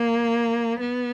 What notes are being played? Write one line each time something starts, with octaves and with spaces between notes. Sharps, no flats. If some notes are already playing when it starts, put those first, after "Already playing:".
Already playing: A#3
B3